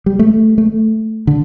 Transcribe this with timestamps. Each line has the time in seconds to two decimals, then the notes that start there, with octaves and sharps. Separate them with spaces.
0.06 G3
0.19 A3
0.58 A3
1.27 D3